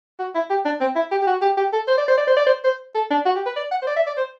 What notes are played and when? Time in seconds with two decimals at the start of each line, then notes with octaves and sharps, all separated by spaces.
0.19 F#4
0.35 E4
0.50 G4
0.65 D4
0.81 C4
0.96 E4
1.11 G4
1.21 G4
1.27 F#4
1.42 G4
1.57 G4
1.73 A4
1.88 C5
1.97 D5
2.08 C5
2.17 D5
2.27 C5
2.37 D5
2.46 C5
2.64 C5
2.95 A4
3.10 D4
3.26 F#4
3.36 G4
3.46 B4
3.56 D5
3.71 F#5
3.82 C5
3.87 D5
3.96 E5
4.07 D5
4.17 C5